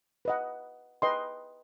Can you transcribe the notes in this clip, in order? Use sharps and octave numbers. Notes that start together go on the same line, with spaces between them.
B4 D#5 F#5
B4 D#5 G5 C6